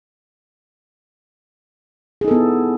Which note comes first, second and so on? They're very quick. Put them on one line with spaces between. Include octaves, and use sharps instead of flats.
G#4 D#4 A4 B3 E4